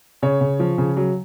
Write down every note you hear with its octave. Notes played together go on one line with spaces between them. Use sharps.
C#3 C#5
C#3
F3
C#3
F#3